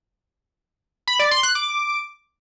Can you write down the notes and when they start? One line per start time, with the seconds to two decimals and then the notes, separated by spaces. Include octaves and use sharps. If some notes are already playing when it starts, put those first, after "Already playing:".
1.08 B5
1.19 D5
1.31 C6
1.43 F#6
1.55 D6